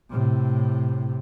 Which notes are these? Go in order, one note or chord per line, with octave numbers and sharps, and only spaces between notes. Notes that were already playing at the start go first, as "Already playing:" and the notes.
A2 C3